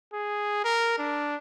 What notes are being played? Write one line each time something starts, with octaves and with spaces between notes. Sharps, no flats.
G#4
A#4
D4